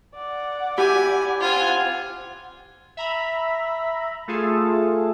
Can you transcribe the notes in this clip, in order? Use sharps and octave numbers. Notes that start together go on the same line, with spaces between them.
D5 F#5
E4 G4 G#5
C4 F4 F#5 G#5
E5 A#5 B5
A3 F4 G#4 A4